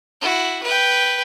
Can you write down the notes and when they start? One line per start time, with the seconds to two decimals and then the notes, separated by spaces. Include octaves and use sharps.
0.21 E4 F#4
0.63 B4 G5